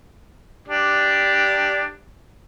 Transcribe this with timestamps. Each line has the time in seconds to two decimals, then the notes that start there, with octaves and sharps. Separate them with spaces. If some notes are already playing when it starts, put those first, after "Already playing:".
0.68 D4 G4